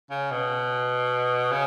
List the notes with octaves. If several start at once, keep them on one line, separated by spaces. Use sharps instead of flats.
C#3
B2
C#3